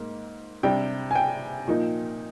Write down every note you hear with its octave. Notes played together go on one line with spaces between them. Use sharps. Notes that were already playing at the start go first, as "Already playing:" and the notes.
Already playing: G#2 A#3
C3 G3 D4 G5
G#5
G5
A#2 F3 A#3 D#4